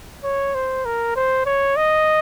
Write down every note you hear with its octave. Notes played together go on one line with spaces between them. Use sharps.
C#5
C5
A#4
C5
C#5
D#5